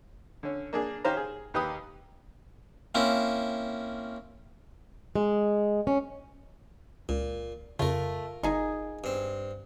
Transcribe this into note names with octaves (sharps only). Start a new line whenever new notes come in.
D3 C#4
A#3 D4 G#4
D#3 C#4 G4 C5 F5 A#5
G#4
D#2 G4 B4 D#6
A#3 C4 C#4 E4
G#3
C#4
C#2 A#2
F2 C#3 A3 F4 A#4
G1 D#4 G#4 G#5
G2 C4